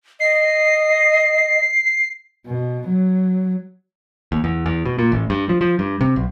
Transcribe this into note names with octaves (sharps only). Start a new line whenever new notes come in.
D#5 C7
B2
F#3
D#2
E2
E2
B2
A#2
A1
G2
F3
F3
G2
C3
B1